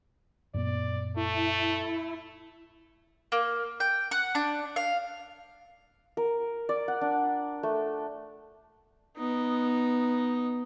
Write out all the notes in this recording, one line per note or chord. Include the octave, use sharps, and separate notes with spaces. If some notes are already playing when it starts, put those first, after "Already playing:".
F#2 A#2 B3 D5
A3 E4
A#3
G5
F#5
D4
F5
A#4
D5
F#5
D4
A3
B3 D#4